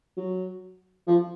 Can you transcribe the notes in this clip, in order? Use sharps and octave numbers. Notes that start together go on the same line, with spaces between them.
F#3
F3